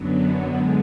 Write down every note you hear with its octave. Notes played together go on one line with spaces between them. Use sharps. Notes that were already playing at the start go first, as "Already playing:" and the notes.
Already playing: F#2 D3 F#3 B3
D3 G#3